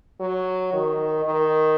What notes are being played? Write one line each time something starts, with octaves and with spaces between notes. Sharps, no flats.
F#3
D#3
D#3